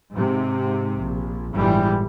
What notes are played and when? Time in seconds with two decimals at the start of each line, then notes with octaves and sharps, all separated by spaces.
0.13 G#2 C3
0.98 A#1
1.54 G1 A2 E3 G3 G#3